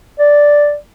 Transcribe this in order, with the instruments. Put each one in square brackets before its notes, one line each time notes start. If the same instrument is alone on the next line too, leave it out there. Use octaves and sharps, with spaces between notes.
[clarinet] D5